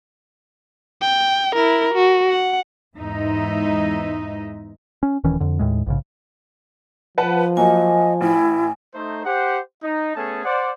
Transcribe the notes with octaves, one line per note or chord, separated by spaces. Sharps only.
G5
E4 A#4
F#4
F#5
E2 G#2 G#3 D#4 D#5 E5
C#4
D#1 D#3 E3 C#4
F2 D3
D#2 A2 G#3
A#1 G#2 C#3
F3 B4 F#5 A5
F#3 A#3 D#5 G#5
A1 E4
A3 D#4 C5
G4 C5 F#5
D#4
A3 B3 C#4 G#4 A4 A5
C5 D5 F#5